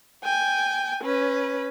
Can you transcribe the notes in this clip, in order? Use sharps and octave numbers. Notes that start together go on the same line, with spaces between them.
G5 G#5
C#4 B4